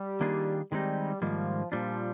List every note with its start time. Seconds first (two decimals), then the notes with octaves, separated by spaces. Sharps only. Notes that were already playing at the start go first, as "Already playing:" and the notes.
Already playing: G3
0.21 D#3 A#3 D4 F4 G#4
0.72 D#3 G3 G#3 C4 D#4
1.21 G#2 D#3 F3 G3 A#3
1.72 A#2 F3 G3 D4